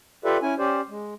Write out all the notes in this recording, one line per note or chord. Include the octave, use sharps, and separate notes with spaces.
F4 G4 A4 B4 D5 E5
C#4 E4 G#5
C#4 G4 C5 D5
G#3